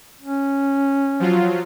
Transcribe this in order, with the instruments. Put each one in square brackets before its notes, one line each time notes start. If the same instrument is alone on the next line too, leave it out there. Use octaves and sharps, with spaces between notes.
[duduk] C#4
[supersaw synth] F3 F#3 F4